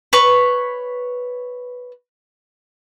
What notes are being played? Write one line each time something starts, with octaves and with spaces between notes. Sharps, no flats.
B4 C#5 C#6